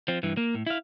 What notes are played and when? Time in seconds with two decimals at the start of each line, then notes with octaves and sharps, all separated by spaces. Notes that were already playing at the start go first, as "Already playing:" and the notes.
0.08 F3 C4
0.23 G2 E3
0.37 A#3
0.55 A2
0.67 E4 F5